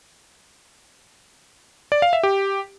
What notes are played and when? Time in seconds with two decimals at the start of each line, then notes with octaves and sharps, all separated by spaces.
1.92 D5
2.02 F5
2.13 E5
2.23 G4